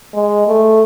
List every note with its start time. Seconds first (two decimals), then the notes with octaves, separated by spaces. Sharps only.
0.14 G#3
0.47 A3